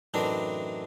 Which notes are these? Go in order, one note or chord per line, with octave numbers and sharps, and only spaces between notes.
F#2 A2 E3 C4 D4 D#4